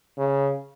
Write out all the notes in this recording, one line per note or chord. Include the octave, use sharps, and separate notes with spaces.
C#3